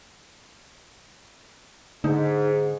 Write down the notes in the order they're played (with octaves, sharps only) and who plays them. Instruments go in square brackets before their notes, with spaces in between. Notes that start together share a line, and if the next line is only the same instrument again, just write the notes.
[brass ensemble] G#2 [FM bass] D3 [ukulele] D#4